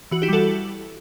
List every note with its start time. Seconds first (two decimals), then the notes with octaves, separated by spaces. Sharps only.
0.11 E3 F#4
0.22 E4 G4
0.28 G3 F#4 A4